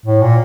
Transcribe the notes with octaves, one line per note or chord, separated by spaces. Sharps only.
A2
A#2